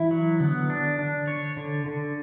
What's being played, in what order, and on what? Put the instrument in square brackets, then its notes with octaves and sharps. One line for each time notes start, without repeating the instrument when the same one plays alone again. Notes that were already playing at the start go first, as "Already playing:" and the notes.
Already playing: [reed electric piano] E3 [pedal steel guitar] E4
[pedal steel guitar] F#3
[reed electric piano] D3 [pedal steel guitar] B3
[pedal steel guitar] D4
D4
C#5
D3
D3